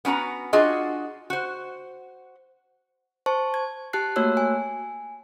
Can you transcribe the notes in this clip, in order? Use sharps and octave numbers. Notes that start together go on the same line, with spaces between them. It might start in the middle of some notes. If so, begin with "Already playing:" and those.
B3 C#4 F#4 A#5
D4 F4 F#4 G#4 D#5
F#4 C5
C5 A5 C#6
G#6
G4 A5 F#6 C7
A3 A#3 F#4 C#5 E6 F#6
G#5